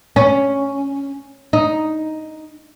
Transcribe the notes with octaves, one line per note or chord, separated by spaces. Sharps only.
C#4
D#4